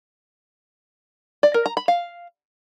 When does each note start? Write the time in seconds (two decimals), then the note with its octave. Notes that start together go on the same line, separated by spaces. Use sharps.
1.43 D5
1.54 A#4
1.66 A#5
1.77 B5
1.88 F5